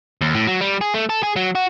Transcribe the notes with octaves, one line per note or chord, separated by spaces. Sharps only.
D#2
A2
F#3
G3
G#4
A3
A4
G#4
F#3
F#4